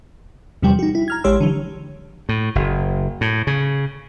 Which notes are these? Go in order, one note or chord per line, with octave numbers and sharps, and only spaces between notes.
E2 C3 F3 G3 G5
D#4 F#4
E4
A#5 F6 G#6
A1 G#3 G4 C#5 C6 E6
D3 E3 F#3
A2
F#1
A2
C#3